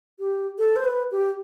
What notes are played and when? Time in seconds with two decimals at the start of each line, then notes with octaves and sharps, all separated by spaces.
0.19 G4
0.59 A4
0.76 C5
0.84 B4
1.11 G4